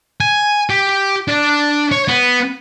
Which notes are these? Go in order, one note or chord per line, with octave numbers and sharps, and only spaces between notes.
G#5
G4
D4 D5
C#5
B3